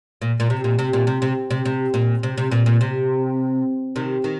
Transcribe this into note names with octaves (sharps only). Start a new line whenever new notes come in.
A#2
A#2
C3
A#2
C3
A#2
C3
C3
C3
C3
A#2
C3
C3
A#2
A#2
C3
C3 D#3
D#3